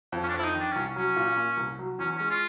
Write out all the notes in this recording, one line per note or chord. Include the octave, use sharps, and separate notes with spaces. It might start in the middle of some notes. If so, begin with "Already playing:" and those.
F2
C#4
D4
F2 E4
D#4
D#3
D4
C2 C#4
F#3 C#4
A#2
A#3
C2
F#3
E2 C#4
G#3 C#4
F4